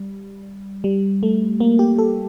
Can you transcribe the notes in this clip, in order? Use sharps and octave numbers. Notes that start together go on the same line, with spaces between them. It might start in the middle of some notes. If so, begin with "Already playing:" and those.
Already playing: G3
G3
A3
A#3
G4
A4